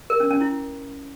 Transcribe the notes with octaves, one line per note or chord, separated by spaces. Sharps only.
A#4
C#4
C#4
E4